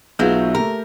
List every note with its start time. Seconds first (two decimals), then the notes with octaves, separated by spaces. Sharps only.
0.19 B1 F#3 G#3 A3 F4 B4 G6
0.55 A3 G4 A#4